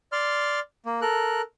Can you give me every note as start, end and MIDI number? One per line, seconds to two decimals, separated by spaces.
0.12 0.60 74
0.12 0.60 84
0.12 0.60 89
0.86 1.00 58
1.01 1.41 69
1.01 1.41 70
1.01 1.41 90